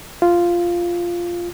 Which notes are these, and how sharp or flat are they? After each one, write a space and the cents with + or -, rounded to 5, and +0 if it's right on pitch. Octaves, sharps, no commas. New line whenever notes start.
F4 -5